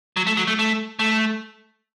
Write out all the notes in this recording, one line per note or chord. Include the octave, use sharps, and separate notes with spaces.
F#3
A3
F#3
A3
A3
A3